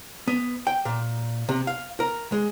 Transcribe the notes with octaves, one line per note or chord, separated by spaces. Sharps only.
B3
G5
A#2
C3
F5
A#4
G#3